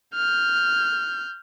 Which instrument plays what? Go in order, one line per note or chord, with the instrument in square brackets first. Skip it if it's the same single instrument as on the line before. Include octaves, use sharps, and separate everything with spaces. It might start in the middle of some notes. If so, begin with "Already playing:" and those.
[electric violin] F6 G6